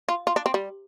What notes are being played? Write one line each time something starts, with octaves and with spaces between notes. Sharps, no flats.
F4
F4
D4
C4
G3